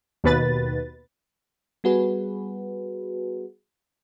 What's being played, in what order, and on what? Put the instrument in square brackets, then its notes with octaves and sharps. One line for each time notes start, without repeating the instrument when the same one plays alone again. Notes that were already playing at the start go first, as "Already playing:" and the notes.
[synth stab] D#2 B2 B4 A6
[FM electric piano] G3 B3 F#4 G#4 B4